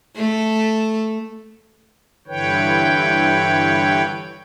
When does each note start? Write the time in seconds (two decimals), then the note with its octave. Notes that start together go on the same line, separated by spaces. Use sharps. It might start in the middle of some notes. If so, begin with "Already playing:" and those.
0.16 A3 A4
2.27 G2 D3 E3 B4 C#5 G5